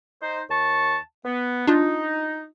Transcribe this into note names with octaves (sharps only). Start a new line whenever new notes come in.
D#4 C5
D#2 A5 C#6
B3
D4 D#4 F4